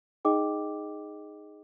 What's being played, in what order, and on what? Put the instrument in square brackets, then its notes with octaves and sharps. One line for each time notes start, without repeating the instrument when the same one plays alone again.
[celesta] D#4 G#4 D#5 G5 D6